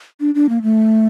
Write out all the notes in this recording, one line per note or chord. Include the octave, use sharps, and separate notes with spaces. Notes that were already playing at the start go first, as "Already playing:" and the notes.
D4
D4
A#3
A3